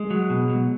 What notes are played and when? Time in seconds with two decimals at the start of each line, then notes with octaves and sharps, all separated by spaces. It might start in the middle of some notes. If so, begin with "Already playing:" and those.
Already playing: G#3
0.10 F#3
0.30 B2
0.49 F#3